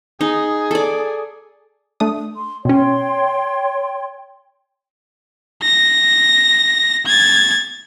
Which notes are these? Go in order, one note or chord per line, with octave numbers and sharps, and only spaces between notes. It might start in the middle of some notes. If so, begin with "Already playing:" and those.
D#4 G#4
A4 D5
A3 D4 D#6
C6
B2 C#4 C#5 G5 C6
A#6
G#6 A6